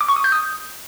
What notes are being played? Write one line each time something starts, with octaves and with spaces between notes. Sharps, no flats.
D6
C#6
D#6
G6
D#6